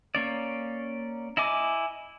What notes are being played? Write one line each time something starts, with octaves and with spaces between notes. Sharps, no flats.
A#3 C#4 D5
E4 D#5 G#5 D6